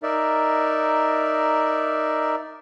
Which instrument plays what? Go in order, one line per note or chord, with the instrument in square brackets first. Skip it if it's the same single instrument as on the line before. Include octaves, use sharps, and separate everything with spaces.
[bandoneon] D#4 A#4 D5 E5